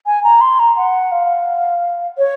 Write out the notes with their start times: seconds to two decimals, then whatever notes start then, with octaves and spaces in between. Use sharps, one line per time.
0.06 G#5
0.24 A#5
0.41 C6
0.59 A#5
0.77 F#5
1.12 F5
2.18 C#5